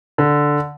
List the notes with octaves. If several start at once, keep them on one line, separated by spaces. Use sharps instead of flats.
D3